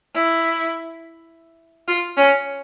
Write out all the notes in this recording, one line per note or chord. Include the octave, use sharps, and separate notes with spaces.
E4
F4
C#4